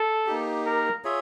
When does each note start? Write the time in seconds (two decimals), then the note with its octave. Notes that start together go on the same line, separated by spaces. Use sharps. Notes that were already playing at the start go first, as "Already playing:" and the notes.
Already playing: A4
0.27 A#3 D#4 G4
0.66 A#4
1.04 F4 G#4 C#5 E5